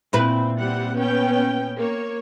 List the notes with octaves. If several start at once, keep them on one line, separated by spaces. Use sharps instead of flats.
A#2 C4 E4 B4
G3 C4 F#5
B3 C#4 G5
A#3 C#5